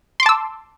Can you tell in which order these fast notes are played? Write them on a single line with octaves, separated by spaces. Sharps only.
C6 D6 A5 E6